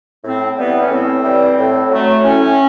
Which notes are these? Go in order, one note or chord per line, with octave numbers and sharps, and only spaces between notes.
A2 C4
E3 G3 B3
C#4
A2 C4
E3 G3
A2
F#3 A3
A2 C#4